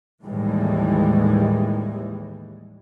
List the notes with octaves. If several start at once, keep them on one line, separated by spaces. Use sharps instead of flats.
D#2 A2 E3 G3 G#3